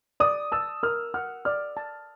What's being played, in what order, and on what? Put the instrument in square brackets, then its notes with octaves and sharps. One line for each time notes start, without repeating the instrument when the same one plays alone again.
[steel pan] D5 [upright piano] D#6
[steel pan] A5 [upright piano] E6
[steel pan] A#4 [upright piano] F6
[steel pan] F#5 [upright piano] F6
[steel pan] D5 [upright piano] F6
[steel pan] A5